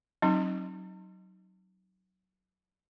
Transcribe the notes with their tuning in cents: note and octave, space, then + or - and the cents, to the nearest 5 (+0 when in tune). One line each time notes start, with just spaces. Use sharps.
F#3 +15 C4 +45 D#4 +0